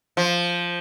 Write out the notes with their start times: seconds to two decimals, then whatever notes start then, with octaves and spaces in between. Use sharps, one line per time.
0.17 F3